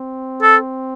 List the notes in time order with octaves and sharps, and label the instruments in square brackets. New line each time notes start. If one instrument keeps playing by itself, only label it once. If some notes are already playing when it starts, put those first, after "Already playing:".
Already playing: [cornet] C4
[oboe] A4